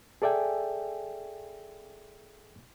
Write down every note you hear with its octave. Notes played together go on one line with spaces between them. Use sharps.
G#4 A4 D5 E5 G5 G#5